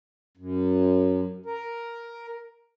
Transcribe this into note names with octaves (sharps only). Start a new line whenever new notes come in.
F#2
A#4